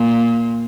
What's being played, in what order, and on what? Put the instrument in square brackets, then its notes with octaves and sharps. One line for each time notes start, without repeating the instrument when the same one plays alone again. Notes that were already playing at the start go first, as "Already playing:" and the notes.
Already playing: [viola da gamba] A#2